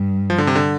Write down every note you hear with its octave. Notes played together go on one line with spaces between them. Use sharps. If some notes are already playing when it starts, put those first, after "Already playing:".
Already playing: G2
F3
D3
C3
D3